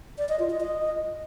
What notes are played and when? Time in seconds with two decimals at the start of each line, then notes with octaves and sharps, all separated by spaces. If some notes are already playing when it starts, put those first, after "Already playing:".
0.18 D5
0.29 D#5
0.39 F4
0.50 D#5
0.61 D#5